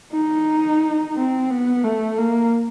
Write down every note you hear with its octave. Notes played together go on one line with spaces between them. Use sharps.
D#4
C4
B3
A3
A#3